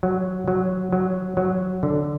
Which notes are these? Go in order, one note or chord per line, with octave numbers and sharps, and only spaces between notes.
F#3
F#3
F#3
F#3
D3